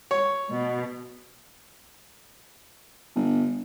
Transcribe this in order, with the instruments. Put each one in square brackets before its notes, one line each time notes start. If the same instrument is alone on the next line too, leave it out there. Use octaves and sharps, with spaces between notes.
[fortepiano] C#5
[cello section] B2
[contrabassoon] G1